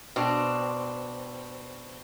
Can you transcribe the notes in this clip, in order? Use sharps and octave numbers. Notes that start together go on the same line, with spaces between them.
B2 C4 D4